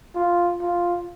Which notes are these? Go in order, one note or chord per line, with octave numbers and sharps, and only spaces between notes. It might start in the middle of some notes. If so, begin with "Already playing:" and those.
F4
F4